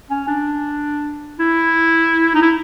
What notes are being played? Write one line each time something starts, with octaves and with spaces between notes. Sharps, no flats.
C#4
D4
E4
D#4
E4